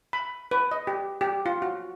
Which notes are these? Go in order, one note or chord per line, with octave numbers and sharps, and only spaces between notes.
B5
B4
D#5
G4
G4
F4
F#4